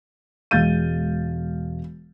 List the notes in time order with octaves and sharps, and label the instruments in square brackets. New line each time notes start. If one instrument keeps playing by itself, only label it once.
[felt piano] E1 G#3 F5 G6 A6 D#7